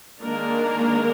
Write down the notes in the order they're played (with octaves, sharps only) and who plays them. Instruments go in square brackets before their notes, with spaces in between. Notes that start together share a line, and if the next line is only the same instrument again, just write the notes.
[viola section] D#3 G#3 A#3 D4 A#4